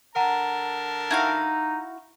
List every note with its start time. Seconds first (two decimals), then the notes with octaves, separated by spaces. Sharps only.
0.16 D3 A#4 F#5 A5 A#5
1.11 D#4 E4 F#4 F5